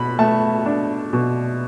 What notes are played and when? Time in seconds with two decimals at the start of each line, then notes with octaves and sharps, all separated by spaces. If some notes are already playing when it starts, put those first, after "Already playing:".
Already playing: B2 B5
0.19 A3 A5
0.66 D4
1.13 B2